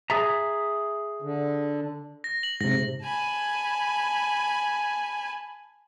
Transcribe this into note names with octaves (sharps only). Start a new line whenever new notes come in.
G#4 E5 A#5
D3
A#6
F#7
G#2 C3 A#6
G#5 A5 B5